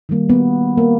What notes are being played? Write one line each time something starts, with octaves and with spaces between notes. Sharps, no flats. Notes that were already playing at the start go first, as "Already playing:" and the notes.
D#3 G3 A#3
B3
A#3